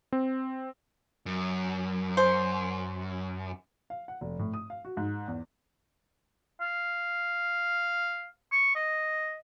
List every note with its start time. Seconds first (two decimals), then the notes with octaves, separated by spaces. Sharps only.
0.12 C4
1.26 F#2
2.17 C5
3.90 F5
4.08 F#5
4.21 F1
4.39 A2
4.54 D#6
4.70 F5
4.85 F#4
4.97 G#2
5.28 E2
6.61 F5
8.52 C#6
8.75 D#5